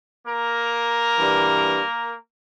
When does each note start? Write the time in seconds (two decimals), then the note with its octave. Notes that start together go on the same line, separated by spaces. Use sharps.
0.27 A#3 A#4
1.17 G2 E3 G3